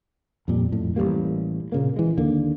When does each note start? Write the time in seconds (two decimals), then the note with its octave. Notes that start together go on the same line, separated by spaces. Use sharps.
0.48 F2 A#2 G3
0.72 F2 A2
0.96 A1 F3 G3 A#3
1.72 A#2 C#3 A#3
1.96 E3 G#3
2.17 D#2 D3 A#3